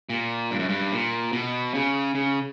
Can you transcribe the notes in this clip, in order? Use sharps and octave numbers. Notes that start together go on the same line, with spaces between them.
A#2
G2
F#2
G2
A#2
B2
C#3
C#3